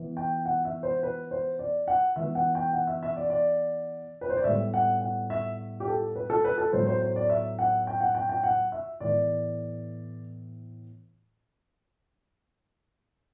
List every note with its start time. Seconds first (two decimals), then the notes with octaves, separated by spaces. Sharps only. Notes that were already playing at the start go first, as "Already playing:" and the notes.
Already playing: E3 B3
0.17 G5
0.45 F#5
0.65 E5
0.83 C5
1.03 B4
1.31 C5
1.59 D5
1.88 F#5
2.16 E3 B3 E5
2.35 F#5
2.55 G5
2.73 F#5
2.87 E5
3.03 E5
3.16 D5
3.30 D5
4.21 B4
4.30 C5
4.37 D5
4.44 A2 G3 B3 E5
4.74 F#5
5.02 F#5
5.30 E5
5.80 G4
5.88 A4
6.16 B4
6.30 A4
6.44 B4
6.58 A4
6.72 A2 F#3 B3 C5
6.87 C5
7.01 C5
7.16 D5
7.30 E5
7.59 F#5
7.87 G5
8.01 F#5
8.15 G5
8.29 G5
8.44 F#5
8.72 E5
9.00 A2 E3 B3 D5